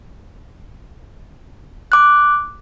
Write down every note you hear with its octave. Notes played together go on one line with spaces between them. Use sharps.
D6 F#6